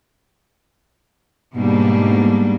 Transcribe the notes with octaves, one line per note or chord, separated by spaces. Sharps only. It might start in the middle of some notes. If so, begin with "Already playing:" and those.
G#2 B2 G3 A#3 D4